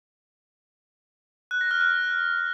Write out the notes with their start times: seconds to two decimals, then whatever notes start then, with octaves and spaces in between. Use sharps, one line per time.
1.51 F#6
1.61 A#6
1.71 F6
1.81 F#6